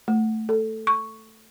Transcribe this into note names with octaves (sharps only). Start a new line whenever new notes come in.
A3
A4
C#6